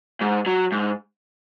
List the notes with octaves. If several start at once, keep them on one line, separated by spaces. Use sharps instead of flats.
G#2
F#3
G#2